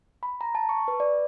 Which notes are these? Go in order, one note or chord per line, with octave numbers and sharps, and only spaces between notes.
B5
A#5
A5
C#6
B4
D5